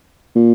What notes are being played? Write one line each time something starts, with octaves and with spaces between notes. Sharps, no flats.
A#2